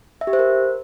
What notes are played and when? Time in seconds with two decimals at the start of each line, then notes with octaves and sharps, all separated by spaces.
0.21 E5
0.27 G4
0.33 C5
0.39 A#4